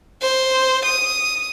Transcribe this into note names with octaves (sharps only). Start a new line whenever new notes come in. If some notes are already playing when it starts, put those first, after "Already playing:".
C5
D#6